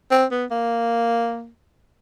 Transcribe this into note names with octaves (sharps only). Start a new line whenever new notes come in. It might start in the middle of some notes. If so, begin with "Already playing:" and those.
C4
B3
A#3